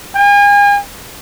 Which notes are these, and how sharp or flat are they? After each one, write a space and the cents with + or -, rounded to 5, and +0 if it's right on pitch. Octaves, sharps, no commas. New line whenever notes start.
G#5 -40